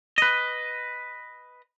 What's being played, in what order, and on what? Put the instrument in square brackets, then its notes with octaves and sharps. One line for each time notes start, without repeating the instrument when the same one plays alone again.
[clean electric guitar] B4 D#5